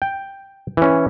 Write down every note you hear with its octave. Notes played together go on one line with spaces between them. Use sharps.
G5
E3 C#4